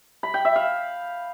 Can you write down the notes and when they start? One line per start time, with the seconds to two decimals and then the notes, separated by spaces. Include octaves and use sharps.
0.23 B5
0.34 G5
0.45 E5
0.56 F5